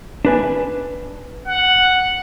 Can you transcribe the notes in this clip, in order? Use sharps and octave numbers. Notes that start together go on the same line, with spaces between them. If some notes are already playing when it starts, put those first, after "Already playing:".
D4 B4 G#5
F#5